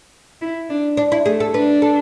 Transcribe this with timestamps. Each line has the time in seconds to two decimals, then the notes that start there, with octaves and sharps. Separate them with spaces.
0.41 E4
0.70 D4
0.97 D4
1.12 E4
1.26 A3 G#4
1.40 A4
1.54 D4 B4
1.82 A4